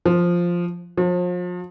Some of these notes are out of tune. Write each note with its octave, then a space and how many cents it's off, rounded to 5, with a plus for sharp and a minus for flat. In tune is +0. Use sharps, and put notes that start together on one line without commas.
F3 +0
F3 +35